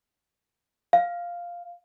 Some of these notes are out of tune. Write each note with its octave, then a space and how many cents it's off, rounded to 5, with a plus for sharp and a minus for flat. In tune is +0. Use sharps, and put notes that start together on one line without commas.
F5 +0